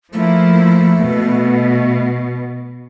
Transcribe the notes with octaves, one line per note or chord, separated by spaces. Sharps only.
F3 A3 A#3 E4
B2